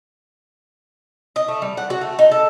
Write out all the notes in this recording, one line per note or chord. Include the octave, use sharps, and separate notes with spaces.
D#5
A3
G3
F#5
F#4
A3
D#4
A4